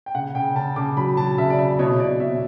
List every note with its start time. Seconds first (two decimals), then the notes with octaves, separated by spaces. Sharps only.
0.06 G5
0.15 C#3 F#5
0.35 C#3 G5
0.56 C#3 A5
0.76 C#3 D6
0.97 F#3 B5
1.17 F#3 A5
1.38 C#3 E5
1.50 D5
1.58 C#3 E5
1.79 B2 C#5
2.00 B2 D5
2.20 B2 E5